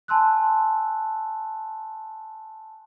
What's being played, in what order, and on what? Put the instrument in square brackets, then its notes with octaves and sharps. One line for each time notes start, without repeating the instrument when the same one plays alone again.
[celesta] G#5 A5 C6 E6 F#6